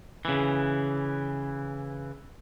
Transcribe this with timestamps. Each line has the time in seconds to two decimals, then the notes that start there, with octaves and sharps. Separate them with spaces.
0.25 C#3 E3